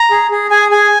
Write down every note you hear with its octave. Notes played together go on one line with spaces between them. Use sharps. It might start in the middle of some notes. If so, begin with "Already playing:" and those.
Already playing: A#5
G#4
G#4
G#4 G#5
G#4 G#5